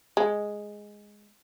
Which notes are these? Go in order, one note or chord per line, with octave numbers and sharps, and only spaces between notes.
G#3